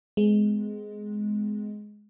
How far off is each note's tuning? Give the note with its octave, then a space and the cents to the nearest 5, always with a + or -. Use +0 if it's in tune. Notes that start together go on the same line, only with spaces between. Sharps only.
G#3 +10 B3 +45